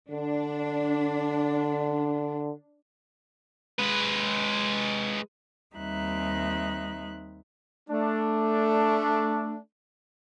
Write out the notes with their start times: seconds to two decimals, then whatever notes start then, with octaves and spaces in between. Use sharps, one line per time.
0.11 D3 D4
3.79 G#3 B4
5.76 D#2 G3 C4 D#4 E5 F#6
7.89 A3 D4